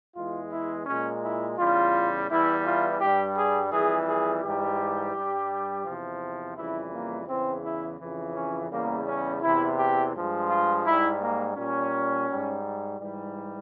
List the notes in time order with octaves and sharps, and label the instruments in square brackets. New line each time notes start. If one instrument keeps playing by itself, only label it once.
[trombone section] E2 E3 G#3 F4
E4
A#2 G#3 C#4
E4
E2 C#3 G3 F4
E2 E3 G3 E4
F4
G2 G3 G4
G#4
F2 E3 G3 G#4
G#4
G#2 E3 G3 G4
G2 G3
E2 C3 F3
F2 C#3 E3 G3 E4
A#3
E2 C#3 E3 C4
E4
F2 C#3 E3
C#4
E2 C#3 G3 A#3
C#4
E2 C3 E3 E4
G4
G2 F3 G#3
F4
G#2 G3 E4
A#3
A#2 G3 C#4
G#2 G3
G#2 E3 G3